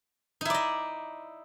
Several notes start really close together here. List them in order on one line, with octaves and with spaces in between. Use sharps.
D#4 E4 D5 D#5